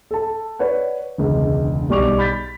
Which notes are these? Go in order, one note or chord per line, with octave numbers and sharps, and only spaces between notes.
A4 A5
B4 C#5 D5 F#5
E1 C#2 D3
B1 G3 D5 C#6 D6 F7
B5 G6 A6 B6